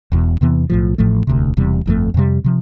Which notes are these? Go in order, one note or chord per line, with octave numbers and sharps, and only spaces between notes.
E1 E2 B2
E2 C3 E3 B3
B1 A2 F3
A1 A2 F3 A3
E1 D2 C3
E1 E2 C3 G3
G1 F2 D3 A3
F2 C3 G3
C3 F3